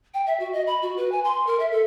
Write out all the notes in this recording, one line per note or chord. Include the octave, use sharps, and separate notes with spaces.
G5
E5
F#4
D#5
B5
F#4
B4
G#5
C6
A#4
E5
A4